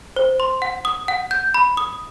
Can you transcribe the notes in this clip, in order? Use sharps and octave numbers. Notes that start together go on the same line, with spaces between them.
C5
C6
F#5
D#6
F#5
G6
B5
D#6